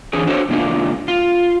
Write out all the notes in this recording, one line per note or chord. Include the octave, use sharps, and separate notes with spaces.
D3 E3 C#4 G#4
D4 F#4 A4 C5 C#5
G#2 C#3 A#3 D4 F4
F4